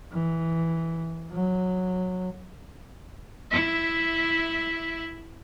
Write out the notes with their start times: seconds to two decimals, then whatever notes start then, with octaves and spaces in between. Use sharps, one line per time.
0.12 E3
1.31 F#3
3.51 E4 E5